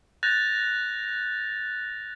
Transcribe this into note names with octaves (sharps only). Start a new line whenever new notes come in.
F#6 G6 A6 A#6 F7